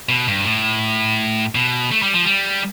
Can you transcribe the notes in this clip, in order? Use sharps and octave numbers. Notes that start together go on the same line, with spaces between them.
B2
G2
A2
B2
A3
G3
F3
G3